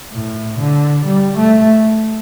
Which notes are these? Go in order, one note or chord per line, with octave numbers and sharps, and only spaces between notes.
A2
D3
G3
A3